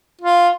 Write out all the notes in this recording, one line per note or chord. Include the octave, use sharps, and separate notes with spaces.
F4